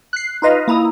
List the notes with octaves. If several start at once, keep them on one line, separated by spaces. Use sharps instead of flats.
F#6 C7
D#4 F4 B4 D#5 F5
A#3 E4 A#5 D#6